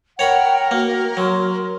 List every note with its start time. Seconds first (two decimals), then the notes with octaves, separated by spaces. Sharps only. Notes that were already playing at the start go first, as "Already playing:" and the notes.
0.19 A#4 C#5 F#5 G5 A#5 B5
0.71 A#3 F#4
1.17 F#3 C6